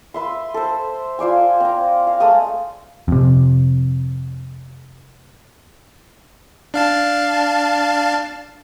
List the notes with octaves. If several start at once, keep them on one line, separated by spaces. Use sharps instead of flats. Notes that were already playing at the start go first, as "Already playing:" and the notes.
B4 E5 C6
A4 C5
F4 C5 D5 G#5
C4 A#5
F5
G#3 A3 A#5 D#6
F2 C3
D4 F5 A5